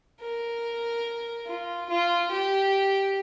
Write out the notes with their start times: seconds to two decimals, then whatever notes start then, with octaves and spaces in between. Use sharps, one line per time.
0.20 A#4
1.47 F4
1.90 F4
2.31 G4